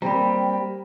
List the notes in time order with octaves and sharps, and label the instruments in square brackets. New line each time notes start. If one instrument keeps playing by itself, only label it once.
[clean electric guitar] G3 [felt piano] A#3 C4 [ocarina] G5 [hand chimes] A#5 B5